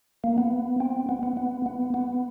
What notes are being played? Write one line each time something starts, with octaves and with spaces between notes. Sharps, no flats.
A#3
B3
C4
B3
B3
B3
B3
B3